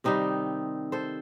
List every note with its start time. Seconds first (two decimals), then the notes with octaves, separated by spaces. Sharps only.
0.04 C3 D#3 G3 C4 D#4
0.92 A4 C5